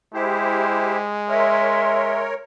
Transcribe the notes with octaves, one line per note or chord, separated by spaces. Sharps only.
G#3 E4 G4 C5
A#4 C#5 E5 C6